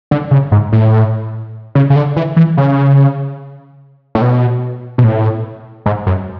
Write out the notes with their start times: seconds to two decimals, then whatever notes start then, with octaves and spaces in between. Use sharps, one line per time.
0.11 D3
0.31 C#3
0.52 G#2
0.73 A2
1.75 C#3
1.90 C#3
1.96 D3
2.16 E3
2.36 E3
2.57 C#3
4.15 A2
4.22 B2
4.98 B2
5.04 A2
5.86 G#2
6.07 F#2